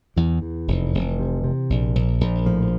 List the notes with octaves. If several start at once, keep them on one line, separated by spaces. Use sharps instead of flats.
E2 E3
E2
F1
F1
C3
C3
A#1
A#1
A#1
A2 F3